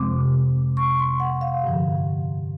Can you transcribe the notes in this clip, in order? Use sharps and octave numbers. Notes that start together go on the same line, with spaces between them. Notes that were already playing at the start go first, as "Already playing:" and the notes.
Already playing: F2 C3 F3 G#3 C4 D6
C#6
C6
F#5
F5
G2 D3 F3